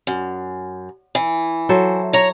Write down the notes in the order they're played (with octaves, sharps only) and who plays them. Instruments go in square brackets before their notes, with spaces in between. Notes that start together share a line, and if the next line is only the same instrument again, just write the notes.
[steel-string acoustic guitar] F#2
E3
[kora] F#3 A4 C5
[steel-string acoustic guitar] C#5 A#5